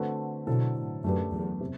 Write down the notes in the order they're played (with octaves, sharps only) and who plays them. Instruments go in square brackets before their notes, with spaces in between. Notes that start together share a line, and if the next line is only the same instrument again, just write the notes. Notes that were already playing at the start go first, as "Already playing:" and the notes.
Already playing: [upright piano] D3 A3 C4 F#4 B4
[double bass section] B2 [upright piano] D3 F#3 C4 E4 A4
[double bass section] A2
[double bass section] F#2 [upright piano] A3 D4 G4 B4
[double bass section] E2
[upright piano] C3